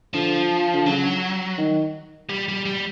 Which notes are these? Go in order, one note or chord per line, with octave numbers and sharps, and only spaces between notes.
D3 F3
D3
C#3 F#3
D#3
G3
G3
G3